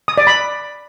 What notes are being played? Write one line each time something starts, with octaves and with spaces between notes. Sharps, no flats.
D#6
D5
B5